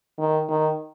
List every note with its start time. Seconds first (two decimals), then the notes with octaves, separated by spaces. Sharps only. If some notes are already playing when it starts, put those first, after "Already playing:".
0.19 D#3
0.49 D#3